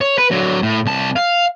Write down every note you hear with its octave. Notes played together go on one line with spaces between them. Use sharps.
C#5
B4
D3 F#3
A2
C2 A5
F5